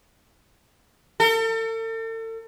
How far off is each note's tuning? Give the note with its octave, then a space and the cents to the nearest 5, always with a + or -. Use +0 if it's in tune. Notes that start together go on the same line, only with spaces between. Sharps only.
A4 +40